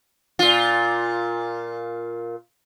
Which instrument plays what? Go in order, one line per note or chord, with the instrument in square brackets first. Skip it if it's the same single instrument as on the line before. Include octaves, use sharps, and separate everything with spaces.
[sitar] A#2 F4